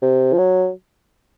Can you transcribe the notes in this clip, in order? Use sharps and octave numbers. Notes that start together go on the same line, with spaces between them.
C3
F3
F#3